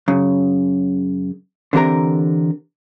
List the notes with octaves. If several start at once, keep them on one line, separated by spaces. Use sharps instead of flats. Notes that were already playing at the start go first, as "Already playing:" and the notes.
F#2 C#3
D3 E3 C4 G4 A#4 A#5